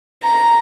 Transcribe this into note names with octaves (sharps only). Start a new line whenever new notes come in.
A#5